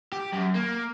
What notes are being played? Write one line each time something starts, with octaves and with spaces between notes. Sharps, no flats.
G4
F#2
A#3